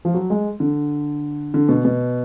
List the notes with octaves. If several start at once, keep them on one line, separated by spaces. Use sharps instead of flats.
F3
F#3
G#3
D3
D3
B2
B2